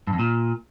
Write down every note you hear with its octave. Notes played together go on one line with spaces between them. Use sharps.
G2
F2
A#2